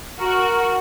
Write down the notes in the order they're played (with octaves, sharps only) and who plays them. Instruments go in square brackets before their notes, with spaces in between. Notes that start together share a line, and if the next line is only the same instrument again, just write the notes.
[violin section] F#4 [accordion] A#4